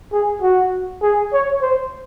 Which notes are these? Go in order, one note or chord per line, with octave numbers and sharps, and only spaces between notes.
G#4
F#4
G#4
C#5
C5